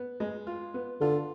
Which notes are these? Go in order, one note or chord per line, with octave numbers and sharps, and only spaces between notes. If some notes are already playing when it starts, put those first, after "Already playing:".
Already playing: B3
G#3
F4
B3
D3 F4